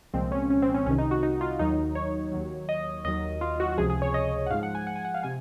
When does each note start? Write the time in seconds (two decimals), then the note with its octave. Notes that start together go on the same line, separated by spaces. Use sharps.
0.13 C2 A#2 F3 G#3 C4
0.32 C#4
0.50 C#4
0.62 C4
0.74 C#4
0.86 C2 C3 D#3 C#4
0.98 D#4
1.11 F#4
1.23 D#4
1.41 F4
1.59 D#2 D#3 F#3 D#4
1.95 C#5
2.32 D#2 D#3 F#3
2.69 D#5
3.05 D#2 D#3 F#3 D#5
3.41 F4
3.60 F#4
3.72 F#4
3.78 C#2 C3 F3 G#4
3.90 G#4
4.02 C#5
4.14 D#5
4.46 F#5
4.51 G#2 F3 G#3 F5
4.63 F#5
4.75 G#5
4.87 F#5
4.96 G#5
5.05 F#5
5.14 F5
5.23 C3 G#5